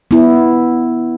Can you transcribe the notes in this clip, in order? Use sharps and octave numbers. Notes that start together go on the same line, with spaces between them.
B3 E4